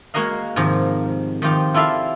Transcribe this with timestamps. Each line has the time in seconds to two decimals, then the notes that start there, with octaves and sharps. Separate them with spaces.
0.14 G#3 A#3 F#4 A#4 D#5 F5
0.56 G#2 C3 D#3 F3
1.42 D#3 F3 F4 G4
1.74 E4 F4 A4 D5 E5 F5